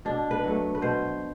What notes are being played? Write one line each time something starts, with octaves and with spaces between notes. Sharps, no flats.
B2 D4
B4
F#3 A3
B4
B2 C5